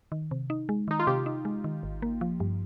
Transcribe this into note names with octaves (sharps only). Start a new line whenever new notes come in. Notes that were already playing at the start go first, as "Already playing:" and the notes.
D#3
C3
D#4
G#3
D#3 D#4
F4
C3 G4
D#4
G#3
D#3
G#1
A#3
F3
G2